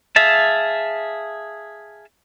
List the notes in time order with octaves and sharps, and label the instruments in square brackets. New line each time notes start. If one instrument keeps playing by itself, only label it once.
[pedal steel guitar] G#4 E5 F5 A5